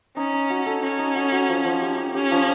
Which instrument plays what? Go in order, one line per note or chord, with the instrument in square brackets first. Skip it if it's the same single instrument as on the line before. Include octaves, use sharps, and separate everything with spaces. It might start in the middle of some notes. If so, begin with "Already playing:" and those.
[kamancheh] C#4 [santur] D#4
[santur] D#4
F#4
A4
[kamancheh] C#4 [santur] F#4
[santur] D#4
F#4
F#4
F3
F3
G4
G4
[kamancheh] C#4 [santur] G4
[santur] F3